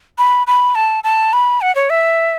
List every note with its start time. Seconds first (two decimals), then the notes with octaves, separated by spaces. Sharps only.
0.18 B5
0.47 B5
0.75 A5
1.04 A5
1.33 B5
1.61 F#5
1.75 C#5
1.90 E5